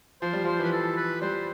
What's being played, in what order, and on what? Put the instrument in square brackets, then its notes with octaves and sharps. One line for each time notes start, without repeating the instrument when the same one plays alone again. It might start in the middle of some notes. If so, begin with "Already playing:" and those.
[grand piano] F3 [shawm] C5
[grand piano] G3
[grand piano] F3 [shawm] C5
[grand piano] E3 [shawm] B4
[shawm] A4
B4
[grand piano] G3 [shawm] C5